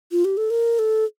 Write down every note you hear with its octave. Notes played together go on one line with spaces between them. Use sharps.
F4
G4
A4
A#4
A4